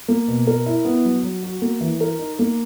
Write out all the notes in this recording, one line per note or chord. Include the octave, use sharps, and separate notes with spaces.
A#3
B2
A#4
E4
B3
F#3
F#3
F#4
A#3
E3
A#4
D#4
A#3